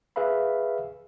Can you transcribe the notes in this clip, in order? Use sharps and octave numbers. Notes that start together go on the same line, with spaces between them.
G#4 B4 E5 F5 B5